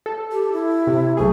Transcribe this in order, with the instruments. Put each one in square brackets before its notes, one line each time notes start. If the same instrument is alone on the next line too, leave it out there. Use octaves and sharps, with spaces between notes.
[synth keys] A4
[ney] G4
E4
[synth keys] C3
[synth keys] B1 G#4 [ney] A3